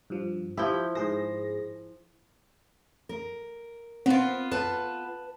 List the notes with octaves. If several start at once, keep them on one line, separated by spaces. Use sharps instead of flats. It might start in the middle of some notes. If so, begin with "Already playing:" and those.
G2 F3
F3 E4 G4 G6
G#2 G#4 C5 A#6
A#4
B3 C4 F4
B4 A5